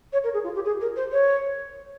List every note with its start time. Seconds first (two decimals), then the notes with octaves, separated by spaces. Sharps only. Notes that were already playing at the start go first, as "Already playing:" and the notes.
0.13 C#5
0.24 A#4
0.34 G#4
0.44 F4
0.55 G4
0.65 G#4
0.81 A#4
0.96 C5
1.12 C#5